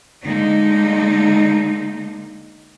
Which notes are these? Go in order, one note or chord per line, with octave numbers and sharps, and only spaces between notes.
D3 G#3 A#3 D#4